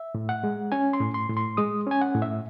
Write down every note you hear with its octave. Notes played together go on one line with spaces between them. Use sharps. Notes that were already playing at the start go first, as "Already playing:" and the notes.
Already playing: E5
A2
F#5
G#3
C#4 G#5
C6
A2
C6
A2
C6
G#3 D#6
C#4 G#5
F#5
A2
E5